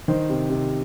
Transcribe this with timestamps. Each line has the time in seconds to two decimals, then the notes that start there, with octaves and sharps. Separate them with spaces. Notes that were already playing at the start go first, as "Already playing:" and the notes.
0.08 D#3 C5
0.30 C3
0.50 C3